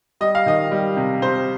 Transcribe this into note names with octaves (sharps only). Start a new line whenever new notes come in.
G3 D#5
F5
D#3 D#5
G3
C3
C3 C5